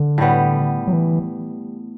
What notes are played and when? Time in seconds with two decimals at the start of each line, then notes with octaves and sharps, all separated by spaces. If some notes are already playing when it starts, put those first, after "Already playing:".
Already playing: D3
0.18 A2 G3 B3
0.87 F#3
0.93 E3